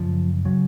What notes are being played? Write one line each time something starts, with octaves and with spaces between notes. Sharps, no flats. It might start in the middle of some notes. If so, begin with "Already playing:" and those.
Already playing: F#2 C#3 F3
C#3 F#3